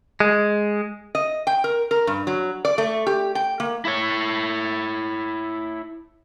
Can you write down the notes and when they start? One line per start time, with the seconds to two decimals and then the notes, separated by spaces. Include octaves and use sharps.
0.20 G#3
1.15 D#5
1.47 G5
1.64 A#4
1.91 A#4
2.07 G2
2.27 F#3
2.65 D5
2.78 A3
3.07 G4
3.35 G5
3.60 A#3
3.85 E4 C#5